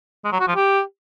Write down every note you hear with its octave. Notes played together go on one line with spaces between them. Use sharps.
G#3
F#3
F#4
F3
G4